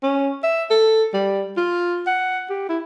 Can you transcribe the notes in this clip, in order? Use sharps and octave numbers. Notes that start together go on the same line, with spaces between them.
C#4
E5
A4
G3
F4
F#5
G4
E4